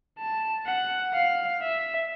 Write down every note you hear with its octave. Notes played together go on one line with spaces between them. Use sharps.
A5
F#5
F5
E5